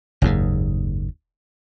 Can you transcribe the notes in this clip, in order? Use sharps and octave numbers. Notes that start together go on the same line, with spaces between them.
F#1 D#2 G#2